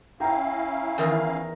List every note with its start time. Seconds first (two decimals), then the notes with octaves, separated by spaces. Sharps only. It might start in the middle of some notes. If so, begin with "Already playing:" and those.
0.20 C#4 E4 F5 G5 A#5
0.98 E2 D#3 A#4